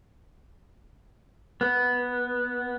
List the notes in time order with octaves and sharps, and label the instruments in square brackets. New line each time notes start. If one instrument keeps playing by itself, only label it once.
[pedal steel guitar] B3